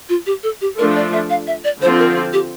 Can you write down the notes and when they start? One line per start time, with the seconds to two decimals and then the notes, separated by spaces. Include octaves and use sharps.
0.09 F4
0.26 G4
0.43 A4
0.61 G4
0.78 F3 A3 D4 F4 A4 A#4
0.95 D5
1.13 E5
1.30 F5
1.47 E5
1.64 D5
1.82 D3 F3 C4 F4 C5
1.99 A#4
2.33 G4